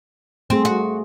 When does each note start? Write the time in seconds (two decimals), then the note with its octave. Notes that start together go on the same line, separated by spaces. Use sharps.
0.50 A3 C4 G#4
0.65 F#4